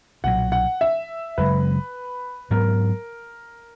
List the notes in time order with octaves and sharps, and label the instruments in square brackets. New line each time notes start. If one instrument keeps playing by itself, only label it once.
[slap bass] B1 A#2 F#3 [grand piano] F#5
[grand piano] F#5
E5
[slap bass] F#1 F#2 C#3 G#3 [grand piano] B4
[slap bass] G#2 F#3 B3 [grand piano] A#4